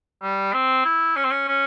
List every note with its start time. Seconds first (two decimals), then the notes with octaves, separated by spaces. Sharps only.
0.22 G3
0.53 C4
0.85 E4
1.16 C#4
1.24 C4
1.31 C#4
1.48 C#4